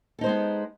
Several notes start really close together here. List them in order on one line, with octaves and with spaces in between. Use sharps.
A4 D#4 C5 G#3 B3